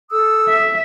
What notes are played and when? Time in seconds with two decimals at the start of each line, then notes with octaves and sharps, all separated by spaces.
0.11 A4 D#6 E6
0.49 E5